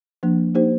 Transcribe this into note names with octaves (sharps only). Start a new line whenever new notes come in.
F3 A#3 D4
A#3 D#4 G4 C5